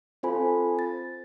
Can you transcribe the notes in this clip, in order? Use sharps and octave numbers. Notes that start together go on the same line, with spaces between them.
C4 F4 A4 C5 G#5 B5
A6